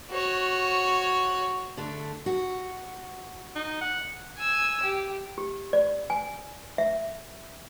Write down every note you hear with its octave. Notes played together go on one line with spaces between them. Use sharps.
F#4 C#5
D3 A3
F#4
D#4
F#5
G#5 E6
G4
G4
D5
G#5
E5